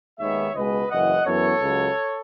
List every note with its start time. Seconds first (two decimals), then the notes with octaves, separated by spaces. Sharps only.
0.19 D#2 D#3 G#3 B3 C#5 E5
0.55 C#2 B2 G#3 B4 D#5
0.90 F#1 F#2 E3 D#5 F#5
1.25 F#2 E3 B3 A4 C#5
1.61 C#2 C#3 F#3